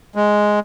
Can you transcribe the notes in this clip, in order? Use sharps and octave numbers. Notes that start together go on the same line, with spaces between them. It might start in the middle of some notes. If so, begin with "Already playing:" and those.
G#3